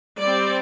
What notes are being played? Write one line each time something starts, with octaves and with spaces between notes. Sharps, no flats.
G3 C4 D5